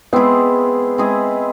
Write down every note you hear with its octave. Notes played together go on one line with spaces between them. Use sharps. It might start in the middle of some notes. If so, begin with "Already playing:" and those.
G#3 B3 C4 E4 G#4
G#3 C4 E4 G#4